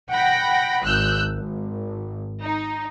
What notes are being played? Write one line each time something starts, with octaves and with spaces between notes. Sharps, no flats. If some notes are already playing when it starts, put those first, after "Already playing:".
F#5 G5 B5 A#6
G#1 E6 F#6 G6
G#1
D#4